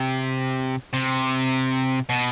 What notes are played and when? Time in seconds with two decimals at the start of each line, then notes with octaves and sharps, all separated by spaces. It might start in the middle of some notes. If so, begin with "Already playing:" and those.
Already playing: C3
0.93 C3
2.09 B2